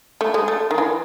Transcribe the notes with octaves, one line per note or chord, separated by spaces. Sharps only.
A3
G#3
A3
D#3
E3